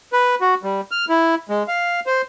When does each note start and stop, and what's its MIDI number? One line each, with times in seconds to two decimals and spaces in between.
0.13 0.35 71
0.41 0.54 66
0.63 0.81 55
0.91 1.05 89
1.09 1.35 64
1.49 1.63 56
1.68 2.00 77
2.07 2.22 72